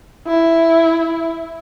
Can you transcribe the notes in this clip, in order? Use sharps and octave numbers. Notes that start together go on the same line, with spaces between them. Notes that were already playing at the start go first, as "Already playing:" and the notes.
E4